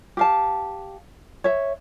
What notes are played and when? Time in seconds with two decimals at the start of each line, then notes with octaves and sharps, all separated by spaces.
0.17 G4 F5 A5
1.44 C#5 E5